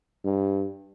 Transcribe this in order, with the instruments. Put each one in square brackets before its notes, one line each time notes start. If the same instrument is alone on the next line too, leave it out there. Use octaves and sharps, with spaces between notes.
[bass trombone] G2